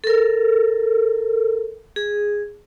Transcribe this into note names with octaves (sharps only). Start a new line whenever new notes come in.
A4 A#4
G#4